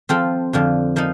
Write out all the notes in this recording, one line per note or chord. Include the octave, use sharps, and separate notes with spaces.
F3 C4 F4 A4
F2 D3 F3
F3 A#3 D#4